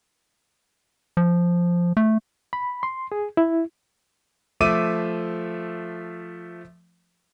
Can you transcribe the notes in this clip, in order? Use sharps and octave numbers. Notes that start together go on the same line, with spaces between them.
F3
A3
B5
C6
G#4
E4
F3 A3 E5 D6 E6 D#7